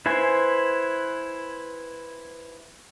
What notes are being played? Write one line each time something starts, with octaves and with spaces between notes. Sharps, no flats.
E4 B4 C5 G#5 C6